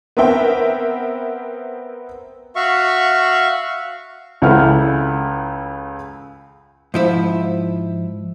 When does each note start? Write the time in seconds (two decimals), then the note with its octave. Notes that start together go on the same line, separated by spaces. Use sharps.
0.17 B3 C4 A#4 E5 G5
2.56 F#4 E5 F5 C#6
4.42 C#2 C#3 E4 A4 F#5 F6
6.94 G#2 F3 E4